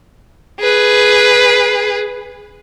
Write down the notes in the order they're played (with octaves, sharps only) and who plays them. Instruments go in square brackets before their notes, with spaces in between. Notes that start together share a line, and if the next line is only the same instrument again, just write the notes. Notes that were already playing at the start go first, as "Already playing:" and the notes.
[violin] G#4 B4